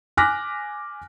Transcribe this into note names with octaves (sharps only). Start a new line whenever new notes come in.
G#5 D6 F6 F#6 A#6 B6